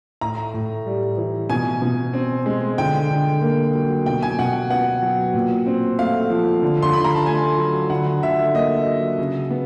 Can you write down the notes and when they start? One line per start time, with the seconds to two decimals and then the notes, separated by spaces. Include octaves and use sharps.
0.21 A2 A#5
0.54 A2
0.86 G3
1.17 E3
1.50 B2 G#5
1.82 B2
2.14 C4
2.46 G#3
2.78 D3 G5
3.11 D3
3.42 A#3
3.75 F#3
4.06 B2 G5
4.22 G#5
4.39 B2 F#5
4.70 B3 F#5
5.02 F#3
5.34 A#2
5.67 C4
5.99 A3 F5
6.30 F3
6.62 D3
6.82 C6
6.93 D3 B5
7.04 A#5
7.15 A5
7.26 A3 G#5
7.58 F#3
7.90 D3 F#5
8.22 D3 E5
8.54 A#3 D#5
8.86 F#3
9.18 C#3
9.50 B3